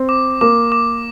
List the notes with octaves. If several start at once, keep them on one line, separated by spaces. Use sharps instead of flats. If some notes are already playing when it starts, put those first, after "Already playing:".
Already playing: C4
D6
A#3 D6
D6